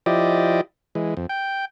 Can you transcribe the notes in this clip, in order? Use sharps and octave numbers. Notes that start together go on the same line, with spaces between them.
F3 E4 G4 D5 D#5
E3 G#3
F2
G5